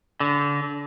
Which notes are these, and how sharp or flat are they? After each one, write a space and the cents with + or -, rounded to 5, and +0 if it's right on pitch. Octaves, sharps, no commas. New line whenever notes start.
D3 -30